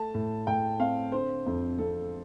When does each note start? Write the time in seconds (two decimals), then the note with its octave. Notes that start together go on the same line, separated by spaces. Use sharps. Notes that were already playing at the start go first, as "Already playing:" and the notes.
Already playing: A3 A5
0.14 A2
0.47 A2 G5
0.79 C4 F5
1.12 D3 C5
1.46 F2
1.78 F2 A4